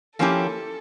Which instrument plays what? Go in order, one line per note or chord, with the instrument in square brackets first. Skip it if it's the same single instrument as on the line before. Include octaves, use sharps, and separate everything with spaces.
[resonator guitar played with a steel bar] F3 A#3 C#4 E4 G4 [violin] A4